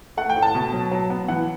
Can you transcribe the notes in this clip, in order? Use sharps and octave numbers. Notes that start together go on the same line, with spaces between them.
A3 F#5
G5
A2
A5
B2
F#3
F#3
B3
E3 F#5